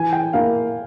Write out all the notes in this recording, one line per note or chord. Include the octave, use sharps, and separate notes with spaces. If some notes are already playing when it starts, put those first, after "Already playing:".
Already playing: E3 G#5
G5
A#3 E4 F5